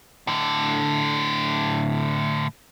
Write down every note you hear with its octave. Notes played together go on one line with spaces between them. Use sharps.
A2 D3